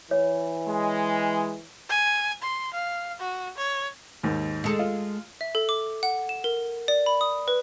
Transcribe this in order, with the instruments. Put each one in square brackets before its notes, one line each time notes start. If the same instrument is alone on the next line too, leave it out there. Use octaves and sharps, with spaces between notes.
[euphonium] E3 [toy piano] C#5
[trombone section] G#3
[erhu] G#5
C6
F5
F#4
C#5
[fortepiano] D#2 G#2 D#3
[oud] G#3 A4
[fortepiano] F4
[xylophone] E5
A4
D6
F#5
E7
A#4
D5
B5
D#6
B4